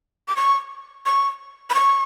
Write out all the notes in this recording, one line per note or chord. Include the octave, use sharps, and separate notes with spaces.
D6
C#6
C#6
B5
C#6